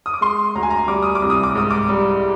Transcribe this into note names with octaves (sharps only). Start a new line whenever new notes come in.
D#6
D6
G#3 C6
D2 A#5
G#5
A#5
G3 D6
D#6
D6
C2
D#6
D6
G#2 D#6
D6
G3